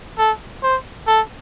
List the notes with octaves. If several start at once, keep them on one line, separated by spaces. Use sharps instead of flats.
A4
C5
A4